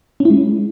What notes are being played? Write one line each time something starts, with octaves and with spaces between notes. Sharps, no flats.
C#4
E4
G#3